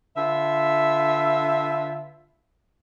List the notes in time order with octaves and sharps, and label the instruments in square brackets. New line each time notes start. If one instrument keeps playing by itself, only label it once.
[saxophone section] D3 F4 B4 E5